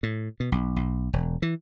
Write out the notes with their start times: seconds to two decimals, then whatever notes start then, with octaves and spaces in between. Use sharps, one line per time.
0.03 A2
0.40 B2
0.52 B1
0.76 B1
1.13 E1
1.42 E3